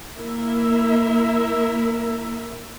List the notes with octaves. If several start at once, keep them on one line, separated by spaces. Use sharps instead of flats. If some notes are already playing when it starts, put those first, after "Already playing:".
A#3 E4 A#4 E5